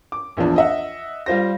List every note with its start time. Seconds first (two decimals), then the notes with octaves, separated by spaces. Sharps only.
0.12 D6
0.37 A#1 E2 F3 D4
0.56 D#5 E5 F#5
1.26 G3 F4 C5 A#6